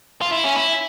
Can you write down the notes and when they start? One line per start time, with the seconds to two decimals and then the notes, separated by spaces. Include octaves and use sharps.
0.21 F4
0.32 E4
0.44 C#4
0.56 E4